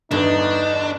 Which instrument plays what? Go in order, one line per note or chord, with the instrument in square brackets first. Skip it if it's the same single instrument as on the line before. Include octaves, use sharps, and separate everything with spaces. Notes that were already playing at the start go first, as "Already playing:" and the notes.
[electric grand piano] E2 G2 D3 [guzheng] E3 [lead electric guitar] D4 [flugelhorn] D#4